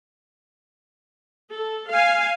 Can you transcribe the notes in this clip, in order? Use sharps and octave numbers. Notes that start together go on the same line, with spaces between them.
A4
F5 G#5